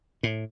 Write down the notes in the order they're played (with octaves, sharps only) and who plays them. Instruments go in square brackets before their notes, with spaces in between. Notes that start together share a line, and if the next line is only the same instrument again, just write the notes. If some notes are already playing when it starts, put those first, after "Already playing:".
[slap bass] A2